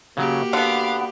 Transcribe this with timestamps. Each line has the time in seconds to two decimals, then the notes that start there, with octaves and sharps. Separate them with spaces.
0.17 C#3 F#3 A#3 F#4 G4
0.53 D3 B3 F5 F#5